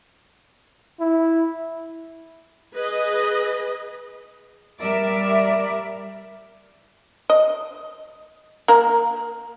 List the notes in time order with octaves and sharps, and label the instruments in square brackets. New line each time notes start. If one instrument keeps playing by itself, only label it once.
[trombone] E4
[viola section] G#4 B4 D#5
[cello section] G3 A#4 D5 E5
[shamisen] D#5
A#3 A#4